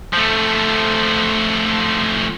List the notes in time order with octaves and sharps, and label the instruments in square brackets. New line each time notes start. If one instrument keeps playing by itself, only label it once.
[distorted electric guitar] F3 A3